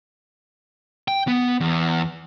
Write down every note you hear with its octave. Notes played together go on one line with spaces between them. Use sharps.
G5
B3
E2